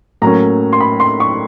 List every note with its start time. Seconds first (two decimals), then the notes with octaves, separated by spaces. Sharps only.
0.22 A2 F#3 A#3 C#4 A#5
0.73 C6
0.80 B5
1.00 C6
1.20 C#6